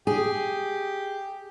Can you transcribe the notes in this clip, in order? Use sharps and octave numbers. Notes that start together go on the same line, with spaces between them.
G4 G#4